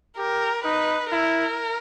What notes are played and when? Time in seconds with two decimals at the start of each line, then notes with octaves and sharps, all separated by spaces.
0.17 G4 A#4
0.64 D#4 B4
1.12 E4 A#4